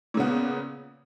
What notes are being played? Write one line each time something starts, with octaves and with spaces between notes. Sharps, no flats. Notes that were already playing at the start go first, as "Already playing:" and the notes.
A#2 C#3 B3